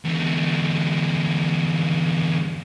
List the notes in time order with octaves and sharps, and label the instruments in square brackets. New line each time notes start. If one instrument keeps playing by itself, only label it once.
[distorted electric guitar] E2 D3